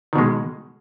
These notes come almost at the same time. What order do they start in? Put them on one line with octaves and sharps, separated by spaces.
D#3 B2 G#3